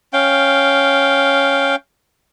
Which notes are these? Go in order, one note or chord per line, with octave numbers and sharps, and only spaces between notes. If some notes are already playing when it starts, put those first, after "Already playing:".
C#4 F5 G5